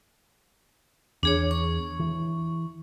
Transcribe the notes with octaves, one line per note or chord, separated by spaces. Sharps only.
E2 D4 G#4 C#5
C#6
E3